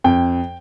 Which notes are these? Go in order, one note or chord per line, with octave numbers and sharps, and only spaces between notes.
F2 G5